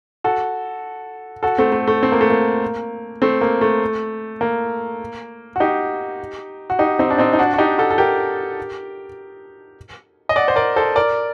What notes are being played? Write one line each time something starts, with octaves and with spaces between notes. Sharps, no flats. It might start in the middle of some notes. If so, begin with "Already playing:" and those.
F#4 A4
F#4 A4
A3 C4
A3
A3
C4
A#3
A3
A#3
A3 C4
A#3
A3
A#3
F#4
D#4 G4
F#4
D#4 G4
C4 D#4
D4
C4 D#4
D#4
D4 F#4
F#4
D#4 G4
F#4 A4
A4
G4 A#4
D#5
D5 F#5
C5
A#4 D5
A4 C5
A#4 D5